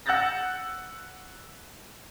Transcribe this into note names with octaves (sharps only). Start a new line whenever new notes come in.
F#5 E6 F#6 G6 A6 A#6